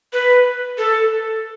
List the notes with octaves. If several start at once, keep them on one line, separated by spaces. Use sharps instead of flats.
B4
A4